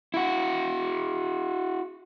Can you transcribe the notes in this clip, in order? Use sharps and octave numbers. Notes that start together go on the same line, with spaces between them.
E4 F#4